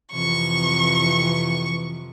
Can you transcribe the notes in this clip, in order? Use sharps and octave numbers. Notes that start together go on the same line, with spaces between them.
F2 C3 E3 C#6